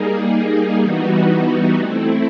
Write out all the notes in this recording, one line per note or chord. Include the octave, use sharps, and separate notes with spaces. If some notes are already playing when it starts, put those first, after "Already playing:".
Already playing: G3 A#3 D#4 G#4
E3 G3 B3 D#4 F#4
A3 C4 E4